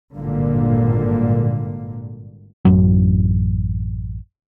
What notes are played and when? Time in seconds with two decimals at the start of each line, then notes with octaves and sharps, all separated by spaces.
0.14 G#1 G2 A#2 D3 A#3
2.65 A1 F#2 F#3